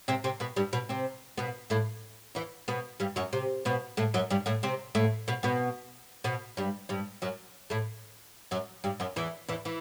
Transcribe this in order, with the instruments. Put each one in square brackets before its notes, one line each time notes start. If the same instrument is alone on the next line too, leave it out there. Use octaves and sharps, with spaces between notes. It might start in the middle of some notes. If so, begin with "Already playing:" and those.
[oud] C3 C4
C3 C4
B2 B3
G2 G3
B2 B3
C3 C4
B2 B3
A2 A3
E2 E3
B2 B3
G2 G3
F#2 F#3
C3
B2 B3
A2 A3
F#2 F#3
G2 G3
A2 A3
C3 C4
A2 A3
B2 B3
B2 B3
B2 B3
G2 G3
G2 G3
F#2 F#3
A2 A3
F#2 F#3
G2 G3
F#2 F#3
E2 E3
E2 E3
E3